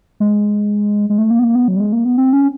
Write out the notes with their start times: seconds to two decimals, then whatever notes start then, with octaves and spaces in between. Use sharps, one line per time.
0.20 G#3
1.10 G#3
1.18 A3
1.30 A#3
1.39 B3
1.44 A#3
1.55 B3
1.68 F#3
1.76 G3
1.80 G#3
1.92 A#3
2.05 B3
2.18 C4
2.33 C#4